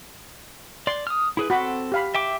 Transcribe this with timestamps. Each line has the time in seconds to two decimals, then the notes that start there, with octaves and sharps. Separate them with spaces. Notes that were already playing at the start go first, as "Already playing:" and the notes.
0.87 D5 C6
1.07 D#6 F6
1.37 E4 G#4 B4
1.50 C4 F#4 A4 B5
1.92 G4 F5 B5
2.14 E5 G5 D6